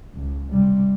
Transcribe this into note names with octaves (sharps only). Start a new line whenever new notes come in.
C#2
C3 G3